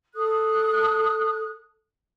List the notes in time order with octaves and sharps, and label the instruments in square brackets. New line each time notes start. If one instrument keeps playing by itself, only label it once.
[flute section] A4 D#6 F#6